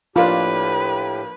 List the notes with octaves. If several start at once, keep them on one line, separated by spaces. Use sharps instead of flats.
A2 F3 A#3 D4 F4 G4 B4